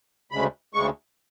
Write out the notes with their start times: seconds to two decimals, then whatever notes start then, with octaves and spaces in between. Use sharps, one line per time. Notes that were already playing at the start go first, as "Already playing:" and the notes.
0.31 D2 C#3 G#3 B5
0.74 D2 C#3 G#3 C#6